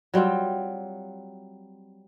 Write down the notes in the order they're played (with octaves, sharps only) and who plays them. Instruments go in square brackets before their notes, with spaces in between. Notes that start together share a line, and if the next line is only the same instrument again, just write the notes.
[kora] F#3 G3 C4 F4